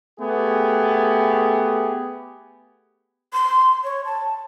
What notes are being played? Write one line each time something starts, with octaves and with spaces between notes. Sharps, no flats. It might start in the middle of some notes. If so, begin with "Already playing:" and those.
A3 B3 G4 G#4
C6
C#5
A5